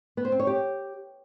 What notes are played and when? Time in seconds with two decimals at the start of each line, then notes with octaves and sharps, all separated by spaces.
0.17 B3
0.25 C5
0.32 C4
0.40 C#5
0.47 G4